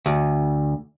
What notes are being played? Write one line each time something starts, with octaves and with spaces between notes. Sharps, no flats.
D2